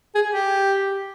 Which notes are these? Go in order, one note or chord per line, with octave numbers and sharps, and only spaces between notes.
G#4
G4